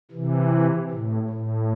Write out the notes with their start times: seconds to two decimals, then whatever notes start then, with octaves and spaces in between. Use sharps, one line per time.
0.11 C3 E3
0.90 A2
1.29 A2